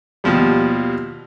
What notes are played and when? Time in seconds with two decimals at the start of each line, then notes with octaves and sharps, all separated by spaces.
0.24 D#2 B2 F3 G3